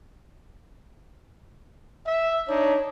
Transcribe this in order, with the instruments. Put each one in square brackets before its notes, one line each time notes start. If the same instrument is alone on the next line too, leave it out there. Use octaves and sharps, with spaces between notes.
[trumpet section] E5
[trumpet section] D4 D#4 [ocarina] C#5